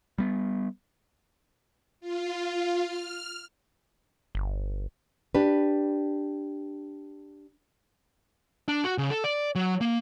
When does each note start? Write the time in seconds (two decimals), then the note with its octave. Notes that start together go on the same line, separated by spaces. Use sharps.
0.18 G3 B3
2.01 F4
2.83 F6
4.35 G1
5.35 D4 G4 B4
8.68 D4
8.84 F#4
8.98 C#3
9.10 A4
9.24 D5
9.55 F#3
9.81 A#3